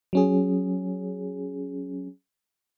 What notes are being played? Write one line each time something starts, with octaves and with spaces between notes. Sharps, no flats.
F#3 C#4 G#4